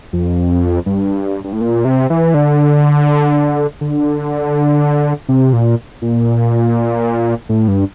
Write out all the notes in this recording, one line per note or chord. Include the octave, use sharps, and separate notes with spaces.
F2
G2
G2
A2
A#2
C3
E3
D3
D3
C3
A#2
A#2
A2
G2